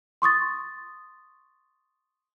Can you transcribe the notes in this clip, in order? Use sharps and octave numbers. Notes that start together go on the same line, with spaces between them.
C6 C#6 D#6 A6